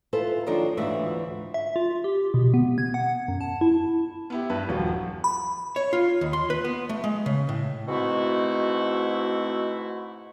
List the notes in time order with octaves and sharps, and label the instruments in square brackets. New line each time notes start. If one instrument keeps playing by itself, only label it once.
[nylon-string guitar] E4 F4 A4 B4 C5
D#3 F3 F#3 A#3 D4 D#4
D2 G#2 E3 F4 F#4 E5
[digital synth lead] E5
F4
G4
B2
B3
G#6
F#5
F#2
A5
E4
[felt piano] B3 E4 G4
G2 B4
D#1 F3 F#3
[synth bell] B5
[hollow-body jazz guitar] C#5
F4
D#2
C6
B4
B3
A3
G#3
C#3
A2
[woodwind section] G#2 B2 A3 C4 E4 F#4